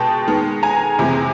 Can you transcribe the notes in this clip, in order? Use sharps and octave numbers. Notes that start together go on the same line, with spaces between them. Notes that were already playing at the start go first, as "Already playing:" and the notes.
Already playing: B2 G#3 G5 A5
D#3 G#3 B3
G#5 A#5
F2 C3 E3 G#3